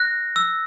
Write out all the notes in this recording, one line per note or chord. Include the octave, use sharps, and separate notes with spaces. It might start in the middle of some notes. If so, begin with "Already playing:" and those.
Already playing: F#6 A#6
E6